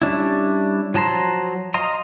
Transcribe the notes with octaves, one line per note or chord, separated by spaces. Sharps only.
G3 C#4 D4 E4
F3 F#3 A5 A#5 C6
D#5 F5 A#5 C6